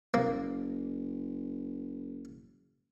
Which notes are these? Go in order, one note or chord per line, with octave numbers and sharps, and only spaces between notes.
F#1 A#3